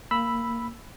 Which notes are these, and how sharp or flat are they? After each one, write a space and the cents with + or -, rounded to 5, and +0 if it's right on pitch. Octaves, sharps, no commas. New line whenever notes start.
A#3 -10 B5 +0 E6 +0